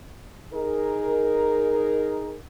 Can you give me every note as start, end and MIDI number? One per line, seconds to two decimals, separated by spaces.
0.53 2.37 63
0.53 2.37 68
0.53 2.37 70